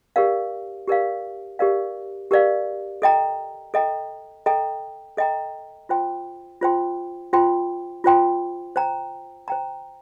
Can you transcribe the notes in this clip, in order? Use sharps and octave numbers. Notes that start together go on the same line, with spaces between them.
G4 A#4 D5 F5
G4 A#4 D5 F5
G4 A#4 D5 F5
G4 A#4 D5 F5
A4 D#5 G5 A#5
A4 D#5 G5 A#5
A4 D#5 G5 A#5
A4 D#5 G5 A#5
F4 C5 G5 C6
F4 C5 G5 C6
F4 C5 G5 C6
F4 C5 G5 C6
C5 G5 A#5
C5 G5 A#5